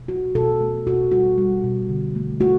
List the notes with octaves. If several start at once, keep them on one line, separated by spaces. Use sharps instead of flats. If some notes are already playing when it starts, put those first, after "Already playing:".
Already playing: B2
F#3 F#4
B2 A4
A3
B2 F#4
G3 F#4
G3
B2
D3
A3
A3 F#4